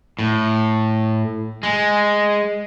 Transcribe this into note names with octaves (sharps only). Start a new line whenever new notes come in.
A2
G#3